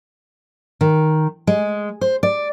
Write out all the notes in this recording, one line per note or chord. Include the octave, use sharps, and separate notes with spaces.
D#3
G#3
C5
D5